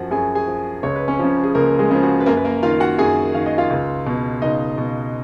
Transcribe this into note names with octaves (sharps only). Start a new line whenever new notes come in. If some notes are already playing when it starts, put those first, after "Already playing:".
Already playing: F#2 F3 F#4 F#5
F#2 G#4 G#5
G#4 G#5
F3
C#2 C#5
B4
C#4 C#5
C#3 F3
G#4
C#2 A#3 A#4
G#3 G#4
C#3 F3
F#4
B4
F#2 A#3 A#4
B4
A#3 A#4
D#3 F4 F5
F#4 F#5
F#2 G#4 G#5
D#3 F5
D#5
F4 F5
C#2
B2
C#2 D#4 D#5
B2